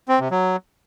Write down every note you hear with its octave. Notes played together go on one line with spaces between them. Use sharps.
C4
C3
F#3